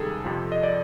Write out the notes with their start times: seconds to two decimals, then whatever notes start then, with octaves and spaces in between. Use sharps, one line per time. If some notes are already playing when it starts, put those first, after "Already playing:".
Already playing: C#2 C3 D#3 G3 G#4 A4
0.25 F2 C3 F3
0.52 D#5
0.63 D5